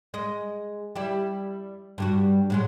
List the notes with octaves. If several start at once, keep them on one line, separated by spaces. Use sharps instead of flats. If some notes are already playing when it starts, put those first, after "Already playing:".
G#3 D#5
G3 E4 G4
G2 G3 F#4
A2 F#3 G#3